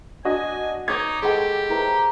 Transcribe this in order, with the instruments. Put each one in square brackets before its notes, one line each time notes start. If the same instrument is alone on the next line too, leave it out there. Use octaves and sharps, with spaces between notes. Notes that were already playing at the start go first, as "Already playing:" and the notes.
[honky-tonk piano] D4 F#4 D#5 [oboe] G#5
[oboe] D#4 [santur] C#5 D6 [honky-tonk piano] C#6 G#6
[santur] G#3 F#5 B5 [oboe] G4 [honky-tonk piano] A4 G5
[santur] E4 A#4 C5